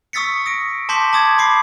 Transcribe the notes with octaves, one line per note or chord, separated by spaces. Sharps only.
C#6 D#6 E6 A6 B6 C#7
D#6 A#6 D7
A5 C6 D6 G6 B6 F#7
A5 D6 D#6 G#6 A6
B5 D6 C7